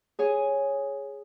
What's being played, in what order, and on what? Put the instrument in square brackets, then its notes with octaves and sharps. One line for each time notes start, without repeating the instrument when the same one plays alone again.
[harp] G#4 C#5 G#5